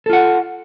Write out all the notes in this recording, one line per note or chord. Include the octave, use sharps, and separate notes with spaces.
F4 A4 F#5